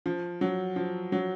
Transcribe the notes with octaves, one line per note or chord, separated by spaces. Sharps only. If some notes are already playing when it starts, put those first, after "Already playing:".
F3
F#3
F3
F#3